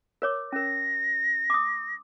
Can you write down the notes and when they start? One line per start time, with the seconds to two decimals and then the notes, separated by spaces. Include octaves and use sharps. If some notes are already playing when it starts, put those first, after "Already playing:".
0.22 A#4 C#5 D6
0.53 C#4 A#4 A#6
1.50 D6 D#6